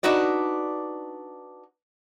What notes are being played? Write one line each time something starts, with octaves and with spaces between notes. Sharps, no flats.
D4 D#4 F#4 B4 D5